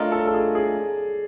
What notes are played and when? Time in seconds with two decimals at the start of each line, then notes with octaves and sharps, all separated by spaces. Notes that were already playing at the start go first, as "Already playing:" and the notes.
Already playing: A3 D4 F4 A#4 D5 D#5
0.12 A4
0.27 A4
0.34 G#4
0.55 G#4